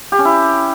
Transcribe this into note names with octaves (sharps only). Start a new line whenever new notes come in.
G4
C#4
E4